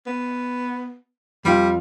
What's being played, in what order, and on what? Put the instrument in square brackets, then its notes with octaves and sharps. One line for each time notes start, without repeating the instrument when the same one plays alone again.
[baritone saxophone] B3
[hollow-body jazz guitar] F2 F4 [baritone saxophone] G3